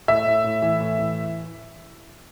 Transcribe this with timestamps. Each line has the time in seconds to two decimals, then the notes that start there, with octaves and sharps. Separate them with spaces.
0.08 A2 E5
0.26 A2
0.44 A2
0.62 E3
0.80 A2
0.98 E3